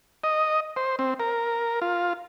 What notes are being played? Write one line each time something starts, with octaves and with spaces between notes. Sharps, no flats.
D#5
C5
C4
A#4
F4